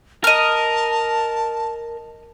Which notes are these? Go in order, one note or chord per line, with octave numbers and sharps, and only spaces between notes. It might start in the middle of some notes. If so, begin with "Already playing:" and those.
A#4 D#5 A5 F6